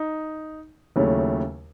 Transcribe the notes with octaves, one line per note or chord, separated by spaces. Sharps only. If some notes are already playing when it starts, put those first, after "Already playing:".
Already playing: D#4
D#2 C#3 F#3 A3 E4